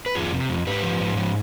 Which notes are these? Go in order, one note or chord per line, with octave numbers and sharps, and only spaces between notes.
B4
F2 F4 G#4
C3
F2
G#2 G4 B4
F3
G#2
F3